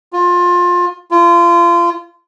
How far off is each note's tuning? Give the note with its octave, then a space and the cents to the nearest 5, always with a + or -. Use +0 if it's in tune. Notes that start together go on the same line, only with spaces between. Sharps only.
F4 +20
F4 -30